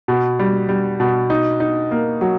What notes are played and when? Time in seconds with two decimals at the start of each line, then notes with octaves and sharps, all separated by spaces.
0.08 B2
0.39 G3
0.69 G3
1.00 B2
1.30 D#4
1.60 D#4
1.91 A#3
2.21 F#3